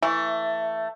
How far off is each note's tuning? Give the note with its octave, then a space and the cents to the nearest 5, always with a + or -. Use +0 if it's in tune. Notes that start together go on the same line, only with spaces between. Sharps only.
E3 +0 A3 +15